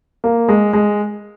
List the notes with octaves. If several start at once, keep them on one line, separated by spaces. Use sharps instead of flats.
A#3
G#3
G#3